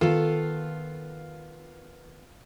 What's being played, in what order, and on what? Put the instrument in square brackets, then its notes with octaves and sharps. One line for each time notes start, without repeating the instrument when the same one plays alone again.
[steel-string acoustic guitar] D#3 B3 F5 [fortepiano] F4 [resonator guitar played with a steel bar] A4